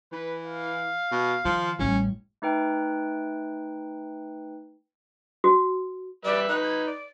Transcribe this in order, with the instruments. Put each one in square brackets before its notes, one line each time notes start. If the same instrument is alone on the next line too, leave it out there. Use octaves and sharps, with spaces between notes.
[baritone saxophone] E3 [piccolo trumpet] B4
[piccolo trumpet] F5
[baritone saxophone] B2
[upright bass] D#3 [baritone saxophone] F3
[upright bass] A1 G3 [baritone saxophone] C#4
[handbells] A3 D#4 B4 G5
[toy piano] F#4
[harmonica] G3 B4 E5 [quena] D5
[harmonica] D#4 B4 [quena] F#6
[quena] G#6
D5